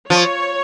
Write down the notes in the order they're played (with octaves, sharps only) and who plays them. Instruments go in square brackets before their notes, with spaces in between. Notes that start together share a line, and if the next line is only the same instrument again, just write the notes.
[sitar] F3 [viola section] C#5